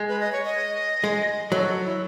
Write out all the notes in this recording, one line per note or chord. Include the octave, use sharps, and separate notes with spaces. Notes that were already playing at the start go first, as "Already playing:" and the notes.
Already playing: G#3
B4
D#5
C#5
D#5
G#3
F#3 A4
E4